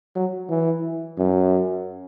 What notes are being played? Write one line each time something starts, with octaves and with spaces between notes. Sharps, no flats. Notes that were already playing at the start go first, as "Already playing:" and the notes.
F#3
E3
F#2